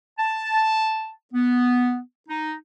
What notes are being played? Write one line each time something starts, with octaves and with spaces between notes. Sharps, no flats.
A5
B3
D#4